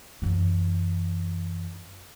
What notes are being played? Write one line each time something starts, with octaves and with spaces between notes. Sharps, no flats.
F#2 E3